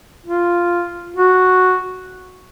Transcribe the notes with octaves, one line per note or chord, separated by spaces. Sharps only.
F4
F#4